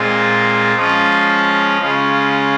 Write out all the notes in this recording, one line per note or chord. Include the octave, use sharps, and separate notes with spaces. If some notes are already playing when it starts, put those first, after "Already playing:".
Already playing: A#2 G#3 C4 F4
F3 G#3 C#4 F4
C#3 G#3 C#4 F4